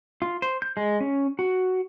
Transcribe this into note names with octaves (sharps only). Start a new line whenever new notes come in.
F4
C5
G6
G#3
C#4
F#4